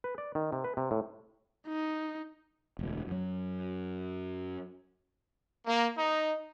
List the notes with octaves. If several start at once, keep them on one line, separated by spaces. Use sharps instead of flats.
B4
D5
D#3
C3
B4
C3
A2
D#4
E1 D2
F#2 F#3
A#3
D#4